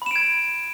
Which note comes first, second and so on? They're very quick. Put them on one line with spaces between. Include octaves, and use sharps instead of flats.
B5 E7 D7 G#6